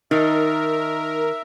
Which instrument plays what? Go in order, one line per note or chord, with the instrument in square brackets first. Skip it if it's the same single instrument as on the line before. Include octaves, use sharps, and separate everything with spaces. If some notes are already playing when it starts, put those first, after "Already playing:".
[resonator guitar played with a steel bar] D#3 [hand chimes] D#4 [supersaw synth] A#4 [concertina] E5